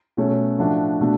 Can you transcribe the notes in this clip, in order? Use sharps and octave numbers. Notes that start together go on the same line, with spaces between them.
B2 F#3 A3 C#4 F#4
A2 F3 A3 D4 F#4
B2 A3 D4 F#4